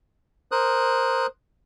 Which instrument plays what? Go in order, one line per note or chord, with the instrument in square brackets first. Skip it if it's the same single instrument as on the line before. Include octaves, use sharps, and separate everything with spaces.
[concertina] A#4 C5 D#6 F#6